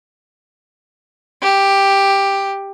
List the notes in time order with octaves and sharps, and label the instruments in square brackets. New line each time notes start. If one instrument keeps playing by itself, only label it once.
[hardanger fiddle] G4